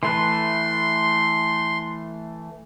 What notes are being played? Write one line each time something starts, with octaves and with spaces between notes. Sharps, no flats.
E3 A3 B4 C6